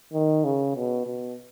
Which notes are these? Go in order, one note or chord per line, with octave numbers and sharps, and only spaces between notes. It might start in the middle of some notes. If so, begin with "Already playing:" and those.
D#3
C#3
B2
B2